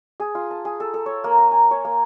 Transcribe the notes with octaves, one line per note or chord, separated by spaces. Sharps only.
G#4
F4
A5
G#4
A4
A4
C#5
A#3
A#5
G#5
C#5
A#3